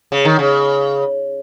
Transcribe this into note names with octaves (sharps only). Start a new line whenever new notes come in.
C#3
D#3
C#3